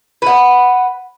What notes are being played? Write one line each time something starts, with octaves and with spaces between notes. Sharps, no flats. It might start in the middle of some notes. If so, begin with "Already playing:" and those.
B4 F#5